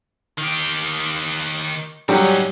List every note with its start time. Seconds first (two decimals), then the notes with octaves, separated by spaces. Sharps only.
0.38 D#3 G4
2.09 G#2 F#3 G3 C#4